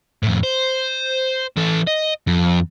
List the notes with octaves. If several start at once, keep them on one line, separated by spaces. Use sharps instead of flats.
F2 A2
C5
E3 A4
D#5
F2